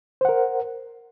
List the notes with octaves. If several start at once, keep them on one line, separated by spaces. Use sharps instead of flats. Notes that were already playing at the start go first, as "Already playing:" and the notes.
A#4 C5 F#5